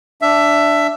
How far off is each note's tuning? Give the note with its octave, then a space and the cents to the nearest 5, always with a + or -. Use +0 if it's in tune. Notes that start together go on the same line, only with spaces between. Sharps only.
D4 +0 E5 +15